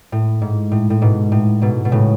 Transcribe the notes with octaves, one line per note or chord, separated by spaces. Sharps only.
A2
G#2
A2
A2
G#2 B2
A2
G#2 B2
B2
A2 C#3